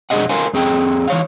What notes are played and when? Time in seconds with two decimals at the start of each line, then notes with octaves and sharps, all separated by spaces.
0.10 B1 F2 G#4 D5 D#5 F#5
0.29 A4 A#4 C5 F5 G#5
0.53 F2 C4 G#4 A4 G5
1.08 E3 C#5 F5